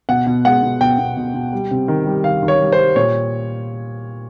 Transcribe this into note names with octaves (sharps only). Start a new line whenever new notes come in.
B2 F#5
B2
G#3 F#5
B2
B2 G5
B2
B2
B2
G3
C3
D#3
G3
D#3 F5
D#3
C#5
G3
C5
G3
A#2 C#5